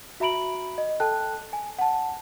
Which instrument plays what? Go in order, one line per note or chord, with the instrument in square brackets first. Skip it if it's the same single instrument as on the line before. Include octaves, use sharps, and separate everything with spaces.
[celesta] F#4 E5 A#5 B5 D7 F#7
D#5
A4 G5 A5 F#6
G#5
F#5 A5